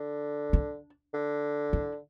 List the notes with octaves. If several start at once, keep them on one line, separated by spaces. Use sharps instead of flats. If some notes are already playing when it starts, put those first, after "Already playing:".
Already playing: D3
D4
D3
E4